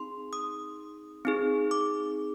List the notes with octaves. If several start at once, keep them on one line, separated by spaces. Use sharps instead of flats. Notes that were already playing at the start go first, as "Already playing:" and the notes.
Already playing: C4 D#4 G#4 C6
D#6
C4 D#4 G#4
D6